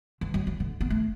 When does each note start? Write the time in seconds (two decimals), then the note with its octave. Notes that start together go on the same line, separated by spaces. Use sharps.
0.21 E3
0.34 F#3
0.47 E3
0.60 D3
0.81 B3
0.90 A3